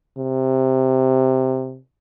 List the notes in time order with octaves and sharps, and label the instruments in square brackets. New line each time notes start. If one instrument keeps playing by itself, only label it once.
[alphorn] C3